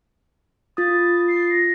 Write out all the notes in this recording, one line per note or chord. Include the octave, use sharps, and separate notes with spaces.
F4 D#6 A6
C7
A#6